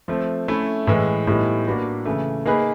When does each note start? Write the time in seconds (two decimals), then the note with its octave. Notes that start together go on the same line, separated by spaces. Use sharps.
0.08 F3 A3 C4
0.48 A3 C#4 E4
0.87 A2 E3 G#3
1.27 A2 E3 G3 B3 D#4
1.67 A#3 D4 F#4 B4
2.05 C#3 E3 A3
2.45 A#3 D#4 G#4 B4